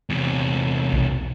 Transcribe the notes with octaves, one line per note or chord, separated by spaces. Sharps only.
E2 C3
B1